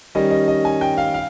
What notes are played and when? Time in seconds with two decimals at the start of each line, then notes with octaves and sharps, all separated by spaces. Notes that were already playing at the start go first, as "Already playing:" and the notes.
0.15 D#3 G3 C#4 D#5
0.31 D#5
0.48 D#5
0.65 G#5
0.81 G5
0.98 F5
1.14 F5